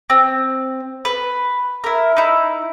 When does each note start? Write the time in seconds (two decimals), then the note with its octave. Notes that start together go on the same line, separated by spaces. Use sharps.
0.10 C4
1.05 B4
1.84 E4 A#4
2.17 D#4 E4